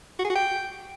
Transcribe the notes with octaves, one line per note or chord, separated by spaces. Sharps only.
F#4
G#4
F#4
G5